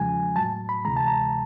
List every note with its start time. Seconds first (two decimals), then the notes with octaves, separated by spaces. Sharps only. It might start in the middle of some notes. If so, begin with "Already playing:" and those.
Already playing: E2 C#3 F3 G#3 G#5
0.36 A2 F#3 A5
0.69 B5
0.85 D2 C3 E3 G#3 A#5
0.97 A5
1.08 A#5